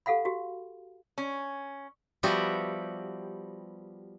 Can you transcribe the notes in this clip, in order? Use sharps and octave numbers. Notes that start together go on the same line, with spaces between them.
G4 A4 F5 F#5 B5
F#4 G4
C#4
F3 G3 B3 F#4 G4 E5